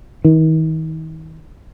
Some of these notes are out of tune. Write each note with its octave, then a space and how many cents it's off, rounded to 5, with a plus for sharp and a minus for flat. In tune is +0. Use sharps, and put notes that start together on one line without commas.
D#3 +40